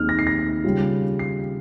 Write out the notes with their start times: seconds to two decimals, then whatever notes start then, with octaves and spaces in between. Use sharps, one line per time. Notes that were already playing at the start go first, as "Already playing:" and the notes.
Already playing: D#2 D#3 G#3 C4 D#4 F6
0.09 A#6
0.19 C7
0.27 A#6
0.64 C#3 G3 C#4 F4
1.19 C7